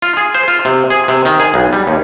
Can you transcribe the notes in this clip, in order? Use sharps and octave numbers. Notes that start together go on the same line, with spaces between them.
F4
G#4
C5
F4
C3
G#4
C3
D#3
G#4
B1
G3
D#2